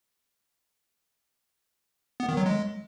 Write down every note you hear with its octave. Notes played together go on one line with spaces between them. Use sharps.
B3
D#3
F#3
G#3